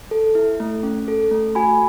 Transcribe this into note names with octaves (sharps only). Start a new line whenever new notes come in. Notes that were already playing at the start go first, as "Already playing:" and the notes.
A4
E4
A3
C#4
A4
A3
F#4 G#5 B5